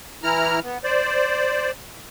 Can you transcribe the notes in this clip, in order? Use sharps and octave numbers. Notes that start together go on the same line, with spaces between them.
E3 E4 A#5 F6
B3
C5 D5